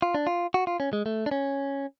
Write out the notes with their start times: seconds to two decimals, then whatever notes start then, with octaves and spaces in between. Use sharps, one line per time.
0.02 F4
0.15 D4
0.27 F4
0.54 F#4
0.67 F4
0.80 C#4
0.93 G#3
1.06 A3
1.26 D4
1.31 C#4